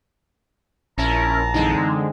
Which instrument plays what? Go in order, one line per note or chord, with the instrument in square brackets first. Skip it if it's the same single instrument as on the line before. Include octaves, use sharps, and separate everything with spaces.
[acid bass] A#1 [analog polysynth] C#4 E4 A#4 [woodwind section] A5 A#5
[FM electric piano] F#2 E3 D#4 [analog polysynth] D3 G#3 C4